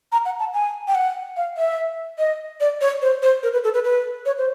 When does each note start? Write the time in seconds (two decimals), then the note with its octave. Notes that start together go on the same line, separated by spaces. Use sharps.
0.12 A#5
0.25 F#5
0.40 A5
0.54 G#5
0.88 G5
0.95 F#5
1.37 F5
1.57 E5
2.18 D#5
2.60 D5
2.81 C#5
3.02 C5
3.23 C5
3.43 A#4
3.53 B4
3.64 A4
3.74 B4
3.84 B4
4.26 C#5
4.38 C5